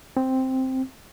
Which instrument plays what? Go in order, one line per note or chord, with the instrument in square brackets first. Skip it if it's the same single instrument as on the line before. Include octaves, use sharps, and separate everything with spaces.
[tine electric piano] C4